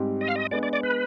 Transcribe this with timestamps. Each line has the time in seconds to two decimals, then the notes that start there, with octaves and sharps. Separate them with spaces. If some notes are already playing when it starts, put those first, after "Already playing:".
Already playing: G#2 G3 C4 G4
0.21 D#5
0.28 F5
0.36 D#5
0.51 G#3 B3 D4 D5
0.63 D5
0.73 D5
0.83 B4